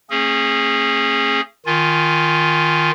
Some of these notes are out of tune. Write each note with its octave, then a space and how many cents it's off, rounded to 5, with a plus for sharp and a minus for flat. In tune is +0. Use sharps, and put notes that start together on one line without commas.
A3 +45 C#4 -30 G#4 +0
D#3 +0 F4 -5 G#5 +5